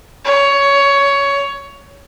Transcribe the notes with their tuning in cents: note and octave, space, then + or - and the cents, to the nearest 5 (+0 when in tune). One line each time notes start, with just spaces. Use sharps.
C#5 +15